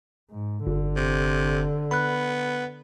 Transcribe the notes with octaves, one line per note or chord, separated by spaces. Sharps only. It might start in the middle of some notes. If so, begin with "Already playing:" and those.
G#2
G1 D3
C3
B3 B5 F#6